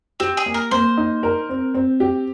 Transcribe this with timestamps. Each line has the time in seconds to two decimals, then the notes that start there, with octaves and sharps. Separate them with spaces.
0.20 C4 G4
0.37 G#4
0.46 A#3
0.54 A#4
0.71 A#3 C5
0.97 D#4
1.23 A#4
1.49 C4
1.74 C4
2.00 G4